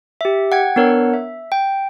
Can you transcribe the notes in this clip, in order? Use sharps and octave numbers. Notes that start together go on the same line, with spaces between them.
G4 E5
F#5 G5 G#6
B3 D4 A#4 C#5 F#5
E5
G5